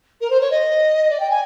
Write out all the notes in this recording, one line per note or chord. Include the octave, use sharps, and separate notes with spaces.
A#4
C5
C#5
D#5
D5
G5
G#5